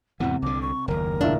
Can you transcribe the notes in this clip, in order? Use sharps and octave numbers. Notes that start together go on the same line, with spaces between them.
E2 G#2 C3 E3 F#5
C2 D3 D6
C#6
F#1 D#2 A#4
C#2 A2 D4 E5